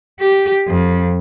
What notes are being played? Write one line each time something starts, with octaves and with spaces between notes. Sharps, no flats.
G4
F2